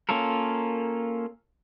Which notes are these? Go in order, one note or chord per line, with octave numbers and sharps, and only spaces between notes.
A#3 C#4 F4 A4 A#4